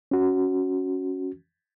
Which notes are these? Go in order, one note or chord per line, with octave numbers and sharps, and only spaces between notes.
C#4 F#4